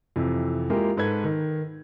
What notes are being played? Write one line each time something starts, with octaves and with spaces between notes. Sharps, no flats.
F2 C3 E3
G#3 A#3 E4 F4 G4 A#4
G#2 A4 B4 G#6
D#3